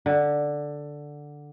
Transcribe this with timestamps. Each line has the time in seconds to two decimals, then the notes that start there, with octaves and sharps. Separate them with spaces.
0.06 D3